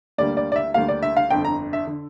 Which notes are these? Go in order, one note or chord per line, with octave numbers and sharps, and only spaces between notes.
D2 D3 G3 A#3 D5
D5
D5
E5
D2 D3 G3 A#3 F5
D5
E5
F5
G1 F2 D3 G5
A#5
E5
D3